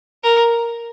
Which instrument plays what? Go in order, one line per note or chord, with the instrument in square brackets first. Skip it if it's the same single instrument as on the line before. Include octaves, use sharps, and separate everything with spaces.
[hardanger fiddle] A#4